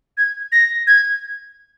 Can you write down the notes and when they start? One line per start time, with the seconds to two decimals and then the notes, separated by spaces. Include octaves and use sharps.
0.17 G#6
0.52 A#6
0.87 G#6